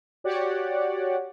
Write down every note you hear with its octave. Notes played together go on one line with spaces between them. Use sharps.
F#4 G4 C#5 D5 F#5